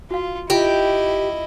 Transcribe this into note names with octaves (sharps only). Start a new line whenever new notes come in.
F4 F#4 F5
E4 F4 G4 D#5